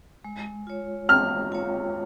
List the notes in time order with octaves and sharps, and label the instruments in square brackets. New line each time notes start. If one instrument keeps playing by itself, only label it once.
[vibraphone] G#3
F4 C#5
[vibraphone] G#3 [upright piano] F6
[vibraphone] F4 C#5